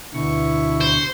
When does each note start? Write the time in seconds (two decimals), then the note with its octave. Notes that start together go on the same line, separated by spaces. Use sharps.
0.14 D2 B2 D3 E4 C#6
0.81 C5